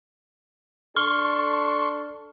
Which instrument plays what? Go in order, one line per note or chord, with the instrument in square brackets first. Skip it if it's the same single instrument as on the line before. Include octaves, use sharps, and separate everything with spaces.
[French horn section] D4 A4 [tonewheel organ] C6 C#6 [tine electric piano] F6